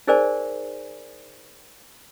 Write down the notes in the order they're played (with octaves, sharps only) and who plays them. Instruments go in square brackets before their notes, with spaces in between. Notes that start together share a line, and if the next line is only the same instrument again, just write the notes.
[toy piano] D#4 G#4 A#4 C5 D5 G#5